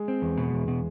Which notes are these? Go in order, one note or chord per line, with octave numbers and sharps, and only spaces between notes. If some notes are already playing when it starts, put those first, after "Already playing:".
Already playing: G#3
C4
E2
B2
E2
B2